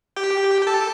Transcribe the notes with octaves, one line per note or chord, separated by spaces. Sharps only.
G4 G5
G5
A4 A5